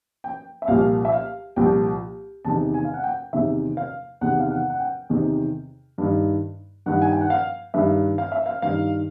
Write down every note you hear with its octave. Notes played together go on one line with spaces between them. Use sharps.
G5
E5
C2 A#2 F3 F5
E5
F5
C2 A#2 F3 G5
E2 C3 D#3 A5
G#5
F5
F#5
G5
E2 C3 D#3 E5
F5
E2 C3 D#3 F#5
F5
F#5
F#5
G5
E2 C3 D#3
G2 D#3
G2 D#3 F#5
G#5
G5
F#5
F5
G2 D#3 E5
F5
E5
F5
G2 D#3 F5